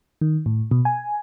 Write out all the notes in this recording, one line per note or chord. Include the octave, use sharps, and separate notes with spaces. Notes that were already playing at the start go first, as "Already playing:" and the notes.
D#3
A2
B2
G#5